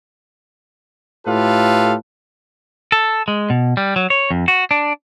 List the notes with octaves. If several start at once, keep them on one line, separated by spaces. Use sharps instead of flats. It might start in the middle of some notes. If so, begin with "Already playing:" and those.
A2 F4 G4 A4 B4 F5
A4
G#3
B2
G3
F#3
C#5
F2
F#4
D4